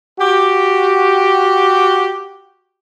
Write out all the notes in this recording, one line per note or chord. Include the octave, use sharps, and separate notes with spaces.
F#4 G4